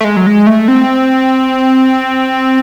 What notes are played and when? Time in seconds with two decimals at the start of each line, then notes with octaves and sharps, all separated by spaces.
0.01 A3
0.04 G#3
0.17 F#3
0.26 G#3
0.47 A3
0.68 C4